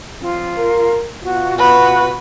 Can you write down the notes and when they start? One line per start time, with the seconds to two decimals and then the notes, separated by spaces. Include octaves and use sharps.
0.22 F3 C4 F4
0.57 A#4
1.23 B2 F4 F#4
1.58 F#4 B4